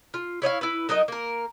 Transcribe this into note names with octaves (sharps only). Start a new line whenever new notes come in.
F4
E4 C#5 D#5 F5
E4 B4
F#3 D#4 A#4 D#5
A#3 A#4